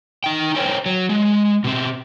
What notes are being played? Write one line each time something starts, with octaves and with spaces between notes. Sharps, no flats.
D#4 G5
A#4 C5 C#5 G5
F#3
G#3
B2 C4